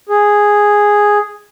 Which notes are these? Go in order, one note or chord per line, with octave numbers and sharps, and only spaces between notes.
G#4